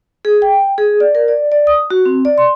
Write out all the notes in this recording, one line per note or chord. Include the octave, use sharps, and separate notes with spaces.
G#4
G5
G#4
D5
A#4
D5
D5
D#6
F#4
C4
D5
C6